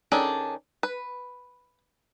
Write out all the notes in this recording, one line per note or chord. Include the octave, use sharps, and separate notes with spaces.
D#3 C#4 D4 G#4 A4
B4